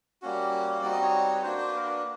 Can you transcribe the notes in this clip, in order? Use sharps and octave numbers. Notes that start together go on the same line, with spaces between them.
G3 A#3 C#4 F#4
G3 C4 D#4 F#4 D5
D#5
C#5
B4
A#3 D4 F#4 C5
C5
B4
A#4
B4